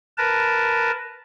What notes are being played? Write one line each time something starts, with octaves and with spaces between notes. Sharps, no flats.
A#4 B4 A5